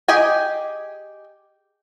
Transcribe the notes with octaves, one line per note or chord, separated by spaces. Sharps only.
G4 G#4 D#5 G5 G#5